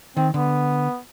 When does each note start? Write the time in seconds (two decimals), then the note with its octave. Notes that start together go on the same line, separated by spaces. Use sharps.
0.17 D#3 C4
0.34 D3 B3